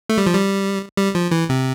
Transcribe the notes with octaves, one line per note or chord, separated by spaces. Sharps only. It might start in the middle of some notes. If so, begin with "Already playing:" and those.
A3
G3
F3
G3
G3
F3
E3
C3